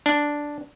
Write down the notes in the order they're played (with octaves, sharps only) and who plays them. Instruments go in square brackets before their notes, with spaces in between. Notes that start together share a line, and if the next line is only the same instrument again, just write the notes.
[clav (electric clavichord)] D4